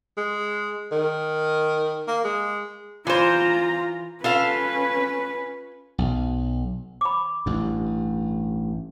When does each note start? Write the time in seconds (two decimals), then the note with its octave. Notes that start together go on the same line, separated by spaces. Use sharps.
0.17 G#3
0.92 D#3
2.07 A#3
2.24 G#3
3.07 E3 F4 C5 A#5
4.24 C#4 F4 A4 B4 F5
5.98 B1
7.01 B5 D6
7.46 A1 G2